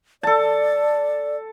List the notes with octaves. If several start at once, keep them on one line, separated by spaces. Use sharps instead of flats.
A4 D5 A5